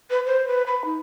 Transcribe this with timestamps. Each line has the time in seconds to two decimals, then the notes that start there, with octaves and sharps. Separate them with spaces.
0.10 B4
0.26 C5
0.48 B4
0.67 B5
0.85 D#4